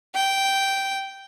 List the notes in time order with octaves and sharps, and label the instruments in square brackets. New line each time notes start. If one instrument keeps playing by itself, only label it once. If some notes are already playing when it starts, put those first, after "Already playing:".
[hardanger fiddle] G5